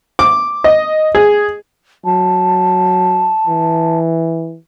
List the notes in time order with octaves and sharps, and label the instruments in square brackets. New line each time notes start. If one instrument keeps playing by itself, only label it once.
[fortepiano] D6
D#5
G#4
[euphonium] F#3 [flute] A5
[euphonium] E3